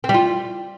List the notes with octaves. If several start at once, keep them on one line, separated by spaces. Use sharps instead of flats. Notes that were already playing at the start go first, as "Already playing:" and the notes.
C4
G3
F4